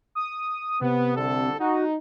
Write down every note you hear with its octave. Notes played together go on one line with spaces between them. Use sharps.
D#6
C3 B3
C2 D3 A4
D#4 F#4